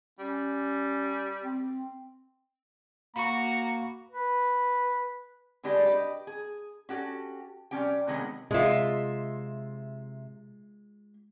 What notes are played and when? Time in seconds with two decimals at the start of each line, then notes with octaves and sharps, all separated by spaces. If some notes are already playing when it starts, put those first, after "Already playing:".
0.19 G3 C#4
1.44 C4
3.16 A#3 F#4 A#5 B5 C#6
4.11 B4
5.63 D3 G3 G#3 D4 G4 B4
5.86 G4 B4 D#5
6.27 G#4
6.89 C#4 F#4 G4 A4
7.71 C3 G3 C#4 G4 G5
8.07 C3 D#3 F#3 G#3 B3 C#4
8.51 C3 G#3 F4 E5